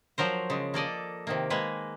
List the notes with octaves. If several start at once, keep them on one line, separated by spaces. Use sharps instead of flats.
F3 F#3 A#4 C5
C#3 G#3
A#3 A4 D5 D#5
C3 D#3 A#3
G#3 A#3 G#4 B4